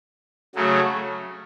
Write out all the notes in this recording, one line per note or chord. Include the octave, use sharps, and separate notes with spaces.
C#3 F#3 A3